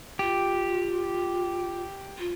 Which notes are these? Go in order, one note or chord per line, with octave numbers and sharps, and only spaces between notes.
F4 G4
F4